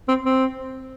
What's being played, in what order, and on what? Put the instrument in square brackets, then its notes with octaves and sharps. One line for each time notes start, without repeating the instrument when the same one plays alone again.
[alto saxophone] C4
C4